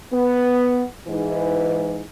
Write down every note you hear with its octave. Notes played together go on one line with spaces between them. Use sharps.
B3
G#2 E3